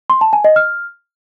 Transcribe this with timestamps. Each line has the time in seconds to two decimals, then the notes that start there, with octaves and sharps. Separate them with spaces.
0.10 C6
0.21 A5
0.33 G#5
0.44 D#5
0.56 F6